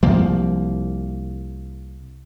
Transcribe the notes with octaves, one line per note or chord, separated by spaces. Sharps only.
C2 F3 A#3